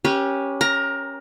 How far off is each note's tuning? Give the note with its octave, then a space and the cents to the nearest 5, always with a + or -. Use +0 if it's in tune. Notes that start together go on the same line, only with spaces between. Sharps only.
C#4 -5 G4 +0 B4 -45
A#4 +25 A#5 +0